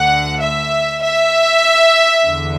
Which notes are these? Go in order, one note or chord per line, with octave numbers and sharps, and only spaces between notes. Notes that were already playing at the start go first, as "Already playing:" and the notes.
Already playing: D2 D3 F#5
E5
E5
E2 D3